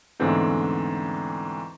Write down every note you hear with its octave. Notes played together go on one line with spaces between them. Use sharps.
E2 G#2 D3 A3 C4 D4